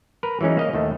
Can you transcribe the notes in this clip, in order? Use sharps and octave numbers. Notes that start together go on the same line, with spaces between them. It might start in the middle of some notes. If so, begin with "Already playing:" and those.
A#4 B4
E3 F#3 G#3 C#4 D#4
A#3 D#5 F5
D#2 D#3 A3